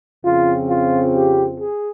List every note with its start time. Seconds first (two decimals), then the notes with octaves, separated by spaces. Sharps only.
0.25 F2 C#3 F3 C4 F4
0.69 F4
1.14 G4
1.59 G#4